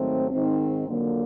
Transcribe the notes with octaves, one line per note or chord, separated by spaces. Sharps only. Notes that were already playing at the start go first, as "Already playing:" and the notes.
Already playing: G#2 D#3 F#3 A3 C4
G#2 D#3 G#3 C4
F2 D3 F#3 A#3